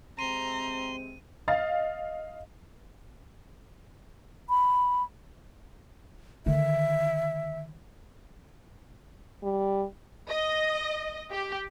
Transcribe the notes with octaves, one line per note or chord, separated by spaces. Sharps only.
C3 G#3 C4 A#5 C6 D#7
D#5 F5 A6
B5
D3 D#3 E5
G3
D#5
G4